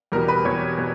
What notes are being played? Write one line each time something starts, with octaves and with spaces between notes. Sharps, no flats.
E2 B2 G3 A#4
B4
E2 B2 G3 C#5
B2 G3